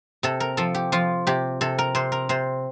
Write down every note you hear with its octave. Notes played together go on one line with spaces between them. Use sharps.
C3 A4
A#4
F3 A4
G4
F3 F4
C3 G4
C3 A4
A#4
C3 C5
A#4
C3 C5